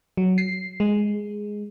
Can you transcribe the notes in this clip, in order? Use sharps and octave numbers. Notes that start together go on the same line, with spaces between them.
F#3
C7
G#3